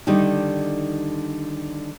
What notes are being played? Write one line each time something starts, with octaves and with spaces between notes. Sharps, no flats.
D3 D#3 G3 D#4